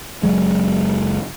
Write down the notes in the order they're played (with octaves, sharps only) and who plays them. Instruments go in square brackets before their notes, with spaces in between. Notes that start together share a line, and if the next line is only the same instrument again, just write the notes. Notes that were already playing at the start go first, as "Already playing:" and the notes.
[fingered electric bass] F#1 E2 F#3 G#3